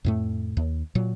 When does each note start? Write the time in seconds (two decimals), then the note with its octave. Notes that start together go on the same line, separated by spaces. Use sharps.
0.04 F2 A2 A3
0.57 D#2
0.95 A#2 F#3